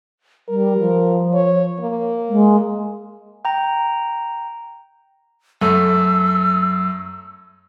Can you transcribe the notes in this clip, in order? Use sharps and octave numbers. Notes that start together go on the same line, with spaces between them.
G3 A#4
F3
C#5
A#3
G#3
G5 A#5
F#2 A3 E6